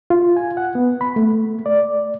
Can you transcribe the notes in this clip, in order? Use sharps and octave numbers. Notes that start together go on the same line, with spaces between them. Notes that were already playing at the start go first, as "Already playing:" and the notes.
F4
G#5
F#5
B3
B5
A3
D5